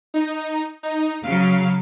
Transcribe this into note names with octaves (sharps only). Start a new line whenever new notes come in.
D#4
D#4
C#3 F#3 F5